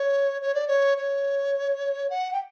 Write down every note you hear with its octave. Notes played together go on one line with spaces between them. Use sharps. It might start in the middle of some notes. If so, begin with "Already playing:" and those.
Already playing: C#5
C#5
D5
C#5
C#5
F#5
G5